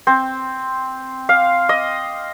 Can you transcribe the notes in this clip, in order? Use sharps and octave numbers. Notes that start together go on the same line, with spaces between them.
C4
F5
D#5